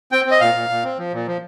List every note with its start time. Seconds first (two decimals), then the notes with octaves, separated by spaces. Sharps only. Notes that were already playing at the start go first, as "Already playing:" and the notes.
0.12 C4 G5
0.26 C4
0.31 D#5
0.40 A#2 F5
0.54 A#2
0.69 A#2
0.84 C4
0.98 F3
1.13 A#2
1.27 F3